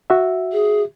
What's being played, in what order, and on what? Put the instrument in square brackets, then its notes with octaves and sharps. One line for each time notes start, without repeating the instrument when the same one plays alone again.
[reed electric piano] F#4 E5
[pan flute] G#4